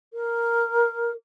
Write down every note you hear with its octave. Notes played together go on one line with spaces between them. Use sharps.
A#4